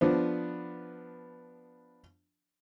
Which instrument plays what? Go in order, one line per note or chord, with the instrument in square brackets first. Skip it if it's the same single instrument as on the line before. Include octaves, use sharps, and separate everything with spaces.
[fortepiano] F3 B3 D4